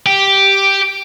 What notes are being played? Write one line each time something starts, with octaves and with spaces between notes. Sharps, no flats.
G4